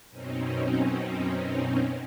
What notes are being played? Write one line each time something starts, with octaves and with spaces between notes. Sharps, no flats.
F#2 B2 C4 C#4 D#4